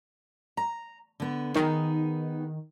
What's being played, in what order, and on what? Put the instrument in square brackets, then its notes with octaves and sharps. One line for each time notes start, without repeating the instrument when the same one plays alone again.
[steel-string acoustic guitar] A#5
D3 B3
[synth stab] D#3 [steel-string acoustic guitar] B3 D#4 G#4